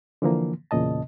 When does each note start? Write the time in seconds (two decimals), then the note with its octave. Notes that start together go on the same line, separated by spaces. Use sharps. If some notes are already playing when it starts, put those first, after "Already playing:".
0.22 D3 E3 F3 A#3
0.71 E2 A#2 C#3 D#5 A5